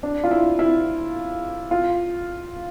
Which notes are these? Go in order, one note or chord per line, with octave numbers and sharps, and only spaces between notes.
D4
F4
E4
E4
F4